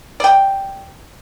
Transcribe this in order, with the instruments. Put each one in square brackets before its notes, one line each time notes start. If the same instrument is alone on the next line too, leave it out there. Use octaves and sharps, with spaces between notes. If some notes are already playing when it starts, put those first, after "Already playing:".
[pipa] D5 G5